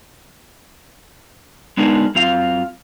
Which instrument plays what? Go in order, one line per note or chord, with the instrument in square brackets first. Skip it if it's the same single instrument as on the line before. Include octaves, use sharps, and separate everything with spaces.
[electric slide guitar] G#3 B3 D4 D#4 G#4 A#4
F#2 C4 F4 F5